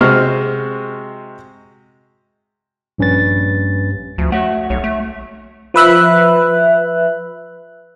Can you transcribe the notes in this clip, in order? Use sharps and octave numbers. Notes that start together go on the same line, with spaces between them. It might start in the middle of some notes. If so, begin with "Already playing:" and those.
C3 G#3 F#4 C5 F6
A#1 G2 C#4 B4 A6
D2 F3
A3 F#4 C#5 F#5
B1 C#5
A3
F3 B4 E5 F#6